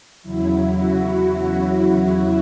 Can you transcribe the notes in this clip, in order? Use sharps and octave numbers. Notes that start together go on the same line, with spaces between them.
E2 C#3 F#3 E4
F#4